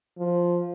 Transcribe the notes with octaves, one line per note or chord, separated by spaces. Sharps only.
F3